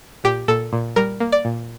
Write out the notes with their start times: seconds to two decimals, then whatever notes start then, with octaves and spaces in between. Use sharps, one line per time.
0.24 A#2 G4
0.48 A#2 A4
0.73 A#2
0.96 G3 A#4
1.20 A#3
1.32 D5
1.45 A#2